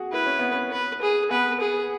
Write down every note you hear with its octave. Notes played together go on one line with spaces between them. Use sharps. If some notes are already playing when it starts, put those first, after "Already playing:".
Already playing: F#4 G#4
E4 B4
C#4
B3
C#4
B4
G#4
B3 B4
G#4